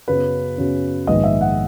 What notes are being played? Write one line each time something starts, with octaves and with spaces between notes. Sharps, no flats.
F#2 C#3 F#3 B3 B4
F#2 C#3 F#3 B3
A#1 G#2 D#3 G#3 B3 D#5
E5
F#5